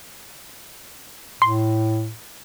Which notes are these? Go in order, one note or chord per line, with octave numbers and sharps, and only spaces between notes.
A2 C6